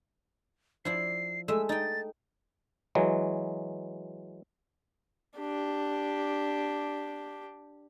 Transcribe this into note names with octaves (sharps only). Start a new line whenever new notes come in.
F3 E4 D5 C7
G#3 A3 E5 E6
D#4 G5 A6
E3 F#3 G#3
D4 G4